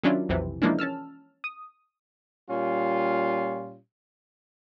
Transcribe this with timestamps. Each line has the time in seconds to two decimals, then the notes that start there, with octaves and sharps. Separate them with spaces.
0.03 D#3 F#3 C#4 D4 E4 F4
0.29 B1 F2 C3 E3
0.62 E3 F3 G#3 A#3 C#4 D4
0.79 C#4 A5 E6 F6
1.44 D#6
2.50 A#2 G3 C#4 F4